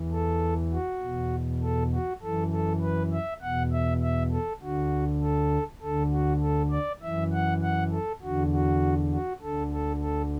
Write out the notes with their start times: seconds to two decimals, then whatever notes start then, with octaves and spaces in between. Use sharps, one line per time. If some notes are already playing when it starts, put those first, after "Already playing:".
Already playing: E2 E3
0.12 A4
0.72 F#4
1.02 E2 B2
1.63 A4
1.92 F#4
2.22 F#2 E3 A4
2.52 A4
2.82 B4
3.12 E5
3.42 E2 B2 F#5
3.72 E5
4.02 E5
4.32 A4
4.62 D2 D3 F#4
5.22 A4
5.82 D2 D3 A4
6.12 F#4
6.42 A4
6.71 D5
7.02 F#2 E3 E5
7.33 F#5
7.62 F#5
7.92 A4
8.22 E2 D3 F#4
8.52 F#4
9.12 F#4
9.42 D2 D3 A4
9.72 A4
10.01 A4